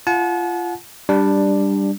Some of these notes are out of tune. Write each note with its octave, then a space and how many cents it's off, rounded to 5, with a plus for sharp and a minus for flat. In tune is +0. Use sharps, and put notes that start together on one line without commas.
F4 -20 F#5 -30 A5 -40
G3 +5 D4 +0